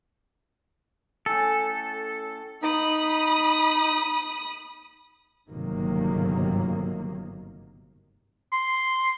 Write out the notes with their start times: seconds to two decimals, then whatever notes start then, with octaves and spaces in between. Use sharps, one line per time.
1.26 A2 C#4 A4 G#5
2.63 D#4 B5 D#6
5.49 G1 G#2 C3 D#3 F#3 A#3
8.52 C6